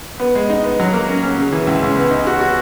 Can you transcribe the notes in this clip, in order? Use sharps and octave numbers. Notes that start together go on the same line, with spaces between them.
B3
G#3
D#4
B3
F#3
A#3
C#4
C#4
C#3
E3
C#2
C#2
B3
D#4
F#4
F#4